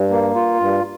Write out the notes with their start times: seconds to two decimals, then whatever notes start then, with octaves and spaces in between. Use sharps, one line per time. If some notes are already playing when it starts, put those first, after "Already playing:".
Already playing: G2
0.10 A#3
0.35 F4
0.60 G2